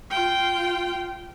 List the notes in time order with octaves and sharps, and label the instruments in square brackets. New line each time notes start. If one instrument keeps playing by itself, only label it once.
[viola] F4 G5